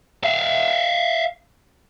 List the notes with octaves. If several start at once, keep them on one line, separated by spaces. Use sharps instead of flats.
E5 F5